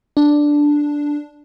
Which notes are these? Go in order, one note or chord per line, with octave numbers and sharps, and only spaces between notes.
D4